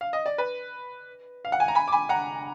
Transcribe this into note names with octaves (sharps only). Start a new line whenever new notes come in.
F5
D#5
D5
B4
F5
F#5
G#5
A#5
G#5 B5
D6
G#5 B5
F#5 A#5